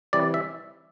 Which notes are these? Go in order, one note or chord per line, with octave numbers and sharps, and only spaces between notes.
C3 E3 G3 D5
E5